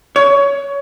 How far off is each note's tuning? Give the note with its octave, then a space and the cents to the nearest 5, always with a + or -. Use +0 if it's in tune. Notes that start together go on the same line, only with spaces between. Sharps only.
C#5 +20